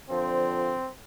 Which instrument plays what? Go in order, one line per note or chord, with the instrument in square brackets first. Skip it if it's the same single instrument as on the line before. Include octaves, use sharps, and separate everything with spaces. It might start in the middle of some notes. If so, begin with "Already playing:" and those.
[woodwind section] D3 F3 [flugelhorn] C4